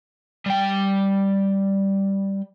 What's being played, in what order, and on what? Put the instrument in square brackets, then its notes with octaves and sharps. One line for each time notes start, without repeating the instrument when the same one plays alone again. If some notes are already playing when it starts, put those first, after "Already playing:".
[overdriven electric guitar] G3 G5